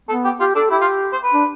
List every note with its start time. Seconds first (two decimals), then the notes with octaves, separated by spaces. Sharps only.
0.09 B3 A4
0.24 G4
0.40 F4 G4
0.55 D4 A4
0.71 E4 G4
0.81 F4
1.13 C5
1.23 B4
1.33 D4